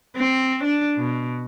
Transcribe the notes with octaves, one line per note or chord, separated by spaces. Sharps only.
C4
D4
B2